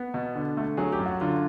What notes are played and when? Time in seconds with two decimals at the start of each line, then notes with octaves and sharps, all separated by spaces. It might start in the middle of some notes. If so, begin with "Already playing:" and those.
Already playing: B3
0.14 B2
0.35 D3
0.57 A3
0.77 F#3 G#4
0.92 G4
0.99 F#2
1.06 F#4
1.21 D3 F4